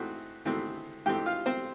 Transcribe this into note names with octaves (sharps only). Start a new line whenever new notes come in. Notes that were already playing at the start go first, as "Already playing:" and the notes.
Already playing: G#2 E3 A3 C4 F#4
G#2 E3 A3 C4
G#2 E3 A3 C4 G4 G5
F4 F5
C4 C5